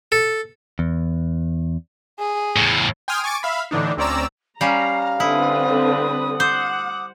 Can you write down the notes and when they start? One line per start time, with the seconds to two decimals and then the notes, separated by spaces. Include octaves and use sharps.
0.12 A4
0.79 E2
2.19 G#4
2.56 E2 A2
3.08 G5 G#5 C6 D#6 F6
3.24 G#5 C#6 D6 A6 D7
3.43 E5 F5 B5
3.71 A2 D3 E3 D4 D#4
3.97 D2 C4 C#4 D5 A#5 E6
4.61 G3 C#4 F5 A#5 C7
5.20 D3 C4 E4 B4 D#6
6.40 C5 F#5 D6